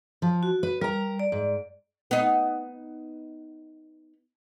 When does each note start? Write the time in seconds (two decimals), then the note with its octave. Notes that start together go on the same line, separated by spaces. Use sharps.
0.22 F3
0.43 F#4
0.63 B4
0.81 G3 A#4 A#5
1.19 D5
1.32 G#2
2.11 B3 D#4